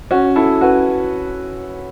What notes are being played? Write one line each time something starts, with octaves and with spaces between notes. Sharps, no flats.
C#4 F#4
E4 A4
F#4 B4